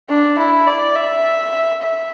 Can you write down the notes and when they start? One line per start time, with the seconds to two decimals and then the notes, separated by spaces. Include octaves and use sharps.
0.09 D4
0.38 E4
0.67 D5
0.95 E5
1.82 E5